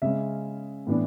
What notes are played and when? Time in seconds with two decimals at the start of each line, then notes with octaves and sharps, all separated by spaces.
0.02 C#3 G#3 C#4 E5
0.87 A2 E3 B3 D4